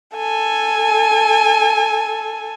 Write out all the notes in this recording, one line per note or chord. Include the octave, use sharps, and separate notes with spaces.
A4 G#5